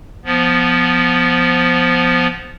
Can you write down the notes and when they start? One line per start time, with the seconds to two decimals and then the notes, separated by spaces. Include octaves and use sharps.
0.25 F3 B3